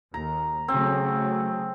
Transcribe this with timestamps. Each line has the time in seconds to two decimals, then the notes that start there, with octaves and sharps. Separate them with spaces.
0.14 D#2 A#5
0.68 C#3 F#3 A3 C4